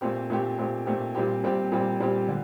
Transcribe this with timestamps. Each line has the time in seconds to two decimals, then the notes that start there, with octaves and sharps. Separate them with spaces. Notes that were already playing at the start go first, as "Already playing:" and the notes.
0.01 A#2 A3 C4 G4
0.30 A#2 A3 C4 G4
0.58 A#2 A3 C4 G4
0.86 A#2 A3 C4 G4
1.15 A#2 G3 C4 G4
1.43 A#2 G3 C4 G4
1.72 A#2 G3 C4 G4
2.00 A#2 G3 C4 G4
2.28 D3